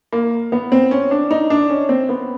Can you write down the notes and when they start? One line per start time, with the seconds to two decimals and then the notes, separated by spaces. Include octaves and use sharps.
0.12 A#3
0.52 B3
0.72 C4
0.91 C#4
1.11 D4
1.31 D#4
1.50 D4
1.70 C#4
1.89 C4
2.09 B3